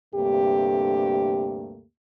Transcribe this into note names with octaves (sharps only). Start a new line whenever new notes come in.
D2 G2 C3 A3 A#3 G4